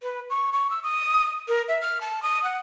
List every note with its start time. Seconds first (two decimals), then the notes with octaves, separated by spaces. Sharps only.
0.03 B4
0.30 C#6
0.53 C#6
0.70 E6
0.83 D#6
1.48 A#4
1.68 E5
1.82 F6
2.01 A5
2.23 D#6
2.44 F#5